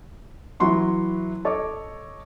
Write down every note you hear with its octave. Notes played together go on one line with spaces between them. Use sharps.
E3 F#3 E4 F#5 C6 C#6
A4 C#5 D#5 D6